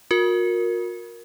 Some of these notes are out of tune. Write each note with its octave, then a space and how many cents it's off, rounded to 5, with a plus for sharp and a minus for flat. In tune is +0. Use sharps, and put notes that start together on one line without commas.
F#4 -45 A#4 +0